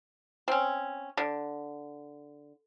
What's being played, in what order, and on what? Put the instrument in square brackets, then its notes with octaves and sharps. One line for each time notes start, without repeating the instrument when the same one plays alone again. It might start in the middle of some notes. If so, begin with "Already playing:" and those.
[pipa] C4 C#4
D3